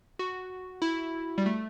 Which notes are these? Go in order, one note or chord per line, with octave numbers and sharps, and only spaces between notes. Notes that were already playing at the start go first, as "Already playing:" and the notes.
F#4
E4
G3
A3